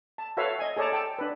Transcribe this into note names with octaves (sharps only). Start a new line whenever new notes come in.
A5
F#4 A4 B4 C#5 E5 F5
D#5 G#5
G#4 A4 C#5 D5 A5 A#5
A4 G5 A5
D4 B4